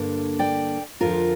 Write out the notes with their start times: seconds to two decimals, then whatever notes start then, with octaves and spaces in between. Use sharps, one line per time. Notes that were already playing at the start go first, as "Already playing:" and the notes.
Already playing: G2 D3 A#3
0.39 D5 G5
1.01 F2 D3 F3 F4 A#4